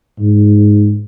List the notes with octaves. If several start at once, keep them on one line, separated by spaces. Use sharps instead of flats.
G#2